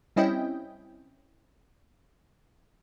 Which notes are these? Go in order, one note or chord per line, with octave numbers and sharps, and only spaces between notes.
G3 C4 C#4 E4 D#5 G5